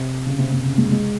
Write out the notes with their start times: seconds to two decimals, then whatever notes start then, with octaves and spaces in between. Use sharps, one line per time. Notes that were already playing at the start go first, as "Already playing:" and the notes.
Already playing: C3
0.26 C#3
0.39 C3
0.52 C3
0.65 C#3
0.78 G#3
0.92 G#3